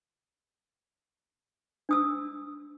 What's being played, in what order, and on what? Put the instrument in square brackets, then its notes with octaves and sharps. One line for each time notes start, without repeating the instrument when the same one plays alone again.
[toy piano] D4 D#6 E6